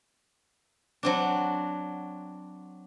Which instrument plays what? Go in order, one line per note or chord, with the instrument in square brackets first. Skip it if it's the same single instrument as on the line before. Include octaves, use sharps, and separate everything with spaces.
[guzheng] F#3 C4 D4